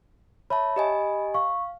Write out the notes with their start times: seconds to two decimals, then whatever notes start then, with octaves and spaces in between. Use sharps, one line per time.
0.50 C#5 E5 A5 B5
0.76 G4 D#5 G#5
1.34 F5 C#6